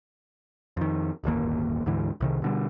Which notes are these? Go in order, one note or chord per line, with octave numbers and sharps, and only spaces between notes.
F2 D#3
D1 G1 D#2 A#3
D2 G#2 D3 E3
C2 C3 D#3
B2 D3 G3